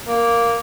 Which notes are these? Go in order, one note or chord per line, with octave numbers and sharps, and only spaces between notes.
A#3